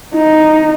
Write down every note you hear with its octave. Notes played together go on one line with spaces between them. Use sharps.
D#4